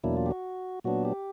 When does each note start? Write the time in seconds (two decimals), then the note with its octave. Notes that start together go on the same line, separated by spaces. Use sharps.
0.04 E2 B2 F#3 A#3 D4 E4
0.17 F4
0.26 G4
0.31 F#4
0.84 A#2 F#3 B3 D4 F#4
1.05 G4